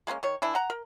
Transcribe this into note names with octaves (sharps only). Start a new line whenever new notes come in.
G#3 A#3 C4 C#4
D#3 C#5
E3 D4 E4
F#5 A#5
A#4